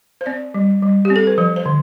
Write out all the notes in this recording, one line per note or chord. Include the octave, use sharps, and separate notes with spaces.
C5
C4 D5
G3
G3
G4
C4
A4
B4
F3 C5
C5
D3